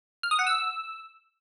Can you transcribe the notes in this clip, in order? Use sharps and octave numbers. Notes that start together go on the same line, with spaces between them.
F6
D#6
F#5
E6